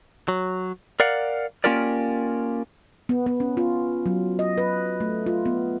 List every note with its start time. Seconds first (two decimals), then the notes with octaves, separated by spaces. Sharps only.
0.28 F#3
1.00 A#4 D5 F5 F#5
1.64 A#3 C#4 F4 G4 A#4 D5
3.09 B3
3.26 B3
3.40 C#4
3.57 F4
4.06 F#3
4.39 D#5
4.58 B4
5.01 A3
5.26 F4
5.46 B3